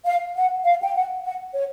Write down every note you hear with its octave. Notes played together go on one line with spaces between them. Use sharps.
F5
F#5
F5
G5
F#5
F#5
C#5